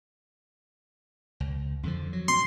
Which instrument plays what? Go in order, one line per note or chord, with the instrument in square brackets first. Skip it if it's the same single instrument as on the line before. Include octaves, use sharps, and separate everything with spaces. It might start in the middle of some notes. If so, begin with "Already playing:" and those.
[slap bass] C#2
F2 D3 F3
F#3
[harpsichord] C6